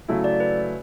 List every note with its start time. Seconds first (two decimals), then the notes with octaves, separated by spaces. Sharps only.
0.08 C#3 F#3 A3 E4
0.24 D5
0.40 B4